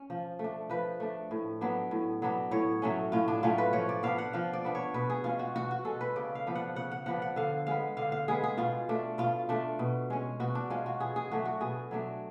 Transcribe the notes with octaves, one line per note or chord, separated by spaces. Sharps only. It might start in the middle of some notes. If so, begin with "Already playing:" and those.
Already playing: C#4
F3
A3
D4
F3 B4
A3 D4
A2
F#3 B3 D4
A2
F#3 B3 D4
A2 C#5
F#3 A3 C#4
A2 F4
D4
F#3 A3 C#4 F4
B4
F3 C#5
D5
B3 D4 F5
F#5
F3 F5
D5
B3 D4
C#5
B2 B4
G#4
G#3 C#4 F4
F#4
B2 F#4
F#4
G#3 C#4 A4
B4
C#3 D5
F5
F3 B3 D4
F#5
C#3 F#5
F#5
F3 B3 D4 F#5
F#5
D3 F5
G#3 B3 F5
D3 F5
F5
G#3 B3 G#4
G#4
B2 F4
A3 D4
B2 F4
A3 D4
B2
G#3 C#4
B2 F#4
D4
G#3 C#4 F4
F#4
B2 G#4
G#4
F#3 A3 D4 F#4
F#4
B2 G#4
F#3 A3 D4